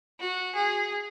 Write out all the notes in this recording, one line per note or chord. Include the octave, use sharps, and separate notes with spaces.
F#4
G#4